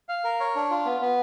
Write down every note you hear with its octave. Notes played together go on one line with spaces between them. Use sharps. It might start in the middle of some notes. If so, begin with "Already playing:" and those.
F5
A#4
C#5
D4
F4
B3
B3